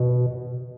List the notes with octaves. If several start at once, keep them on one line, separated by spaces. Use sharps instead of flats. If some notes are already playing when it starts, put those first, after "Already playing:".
Already playing: B2